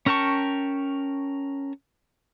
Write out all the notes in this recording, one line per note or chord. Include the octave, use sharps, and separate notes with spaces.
C#4 A#4 G5 A5 C#6